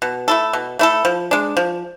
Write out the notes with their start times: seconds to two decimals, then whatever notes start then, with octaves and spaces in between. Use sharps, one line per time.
0.02 B2
0.28 A3 E4 A4
0.53 B2
0.79 A3 E4 A4
1.05 F3
1.31 G#3 D4
1.57 F3